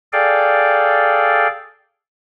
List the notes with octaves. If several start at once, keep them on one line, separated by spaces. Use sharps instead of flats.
G#4 A4 D5 F5 G5